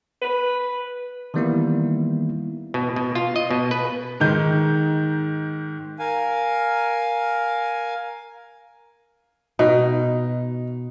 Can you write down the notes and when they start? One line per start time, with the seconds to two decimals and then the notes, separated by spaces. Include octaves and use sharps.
0.22 B4
1.34 D#3 E3 G3 A#3 B3 E4
2.74 B2
2.96 B2
3.15 F4
3.36 D#5
3.51 B2
3.71 B4
4.20 G#2 D#3 G6
5.99 A#4 F5 G#5
9.59 B2 D#4